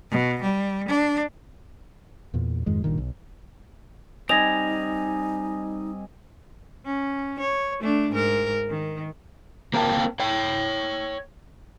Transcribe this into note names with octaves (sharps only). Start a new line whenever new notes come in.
B2
G3
D4
E2 A#2
F2 G#2 D#3 G#3
A#1 G2 A#2 D#3
B1
G3 C4 D#4 D#5 G#5 A#6 F7
C#4
C#5
A3 D4
G#2 A#4
D#3
A#3 C4 A#4 F5 G5 A5
C#5 G5